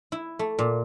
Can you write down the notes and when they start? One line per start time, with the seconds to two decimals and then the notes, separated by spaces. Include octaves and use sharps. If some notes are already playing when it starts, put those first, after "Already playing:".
0.12 E4
0.39 A3
0.59 A#2